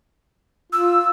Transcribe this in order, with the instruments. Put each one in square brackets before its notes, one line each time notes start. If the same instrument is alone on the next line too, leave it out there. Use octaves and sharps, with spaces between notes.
[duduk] F4 [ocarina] E6